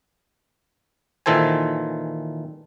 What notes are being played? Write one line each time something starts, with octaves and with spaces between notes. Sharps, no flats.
A#2 D#3 E3 A4 C5 G#5